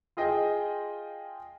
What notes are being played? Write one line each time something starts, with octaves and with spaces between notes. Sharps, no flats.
F4 G#4 D#5 G5